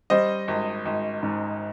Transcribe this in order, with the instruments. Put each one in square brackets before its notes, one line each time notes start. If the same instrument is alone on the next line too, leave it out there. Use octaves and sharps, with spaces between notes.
[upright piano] G3 C5 D#5
G#1
G#1
G#2